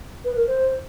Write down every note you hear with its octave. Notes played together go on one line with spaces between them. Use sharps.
B4
A#4
C5